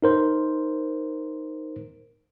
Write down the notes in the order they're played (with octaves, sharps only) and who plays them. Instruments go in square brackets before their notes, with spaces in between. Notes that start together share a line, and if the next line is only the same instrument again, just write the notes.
[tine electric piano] D#4 A#4 C5